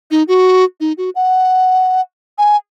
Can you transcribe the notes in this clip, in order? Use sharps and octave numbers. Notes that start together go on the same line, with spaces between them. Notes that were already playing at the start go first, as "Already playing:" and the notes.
D#4
F#4
D#4
F#4
F#5
G#5